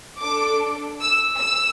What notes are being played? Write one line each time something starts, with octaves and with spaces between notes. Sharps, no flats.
D4 A4 D6
E6
E6